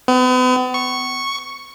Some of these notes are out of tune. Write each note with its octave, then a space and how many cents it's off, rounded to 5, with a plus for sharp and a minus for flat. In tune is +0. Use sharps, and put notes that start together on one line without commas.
B3 +40
C#6 -5